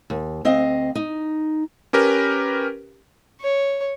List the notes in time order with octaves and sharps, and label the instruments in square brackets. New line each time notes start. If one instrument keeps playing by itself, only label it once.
[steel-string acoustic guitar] D#2
D2 C4 D#5 F5
D#4
[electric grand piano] C#4 G4 A#4 B4
[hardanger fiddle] C#5